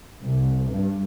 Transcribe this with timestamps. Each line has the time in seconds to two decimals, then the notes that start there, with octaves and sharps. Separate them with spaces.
0.21 C2
0.70 G2